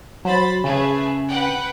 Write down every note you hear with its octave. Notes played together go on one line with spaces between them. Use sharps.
F#3 C5 B5 A6
C#3 A3 G#4 B4
B4 F#5 G5